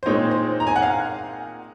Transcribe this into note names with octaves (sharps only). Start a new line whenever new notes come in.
C5
A#2 G#3 C4 D#4 C#5
C5
A#5
G#5
F#5
F5